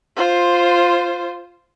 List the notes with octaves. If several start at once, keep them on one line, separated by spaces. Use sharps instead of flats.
F4 C5